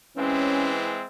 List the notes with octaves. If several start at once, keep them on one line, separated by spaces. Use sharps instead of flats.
E3 G#3 C4 C#4 E5